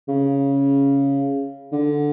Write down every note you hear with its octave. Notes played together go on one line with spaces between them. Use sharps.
C#3
D3